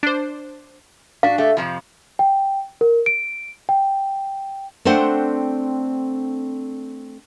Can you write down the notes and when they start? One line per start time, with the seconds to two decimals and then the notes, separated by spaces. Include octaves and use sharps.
0.03 D4 C5
1.23 D4 F#4 F5
1.38 A3 G4
1.57 F2 C3 F3
2.19 G5
2.81 A#4
3.06 D7
3.69 G5
4.85 A3 C4 D4 C5 F#5 G5